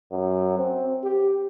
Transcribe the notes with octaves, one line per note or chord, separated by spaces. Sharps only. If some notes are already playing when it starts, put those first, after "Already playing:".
F#2
C4
G4